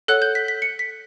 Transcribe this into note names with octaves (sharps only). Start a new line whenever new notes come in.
A4 C#5 F#5 F#6
G6
B6
B6
C#7
B6